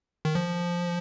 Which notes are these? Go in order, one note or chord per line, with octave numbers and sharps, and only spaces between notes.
D#3
F3